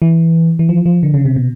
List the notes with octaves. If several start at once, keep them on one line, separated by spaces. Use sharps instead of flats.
E3
E3
F3
F3
D3
C#3
C3
B2